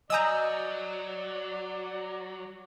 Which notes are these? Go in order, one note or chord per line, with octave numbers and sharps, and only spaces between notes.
F#3 D5 D#5 G#5 A#5 D#6 E6 G6